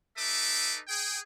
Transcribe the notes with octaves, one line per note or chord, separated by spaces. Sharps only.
D#4 A4 B4 E5 D6
G#4 G5